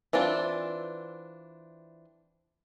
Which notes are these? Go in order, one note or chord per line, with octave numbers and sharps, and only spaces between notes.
E3 C4 D4 F4